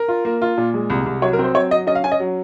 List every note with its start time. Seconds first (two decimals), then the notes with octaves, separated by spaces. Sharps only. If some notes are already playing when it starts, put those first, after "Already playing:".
Already playing: A#4
0.08 F4
0.25 A#3
0.42 F4
0.58 A#2
0.74 G#3
0.90 C2
1.06 C2
1.22 F#3 C#5
1.33 A#4
1.39 C4
1.44 C5
1.55 F#3 C#5
1.71 F#3 D#5
1.87 C#4 D#5
1.95 F5
2.04 C#4 G#5
2.12 D#5
2.20 F#3